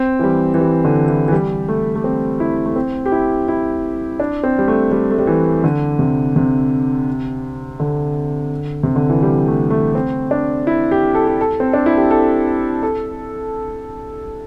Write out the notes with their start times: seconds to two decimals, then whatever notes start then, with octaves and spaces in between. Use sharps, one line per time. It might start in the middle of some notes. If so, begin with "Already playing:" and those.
Already playing: C4
0.19 E3
0.24 G3
0.54 E3
0.61 G3
0.85 D3
1.08 E3
1.28 E3
1.32 G3
1.68 A3
1.95 A3
2.04 C4
2.40 E4
2.66 A3
2.76 C4
3.06 G4
3.12 E4
3.48 E4
4.20 D4
4.43 C4
4.59 G3
4.68 A3
4.92 G3
5.11 A3
5.19 G3
5.27 E3
5.64 D3
5.99 C3
6.36 C3
7.80 D3
8.83 C3
8.96 D3
9.09 E3
9.23 G3
9.48 A3
9.70 A3
9.95 C4
10.31 D4
10.67 E4
10.91 G4
11.15 A4
11.27 G4
11.41 A4
11.60 C4
11.73 D4
11.86 E4
11.98 G4
12.11 A4
12.83 A4